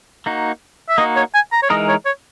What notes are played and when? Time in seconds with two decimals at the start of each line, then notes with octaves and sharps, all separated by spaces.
0.26 A#3 D#4 F#4
0.89 E5
0.98 A#3 D#4 F#4 D#5
1.16 C#5
1.34 G#5
1.52 A#5
1.63 C#5
1.70 E3 G#3 D#4 A#4 D#5
1.88 C#5
2.06 C#5